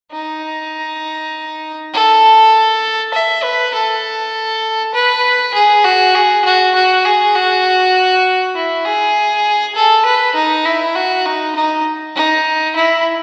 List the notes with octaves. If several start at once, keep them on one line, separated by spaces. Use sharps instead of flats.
D#4
A4
E5
B4
A4
B4
G#4
F#4
G#4
F#4
F#4
G#4
F#4
E4
G#4
A4
B4
D#4
E4
F#4
D#4
D#4
D#4
E4